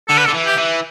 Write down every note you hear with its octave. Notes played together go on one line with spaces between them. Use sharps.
D3 A4
B4
D3 A4
E3
G4
E3